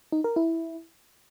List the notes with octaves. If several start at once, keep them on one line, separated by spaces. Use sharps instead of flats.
D#4
A#4
E4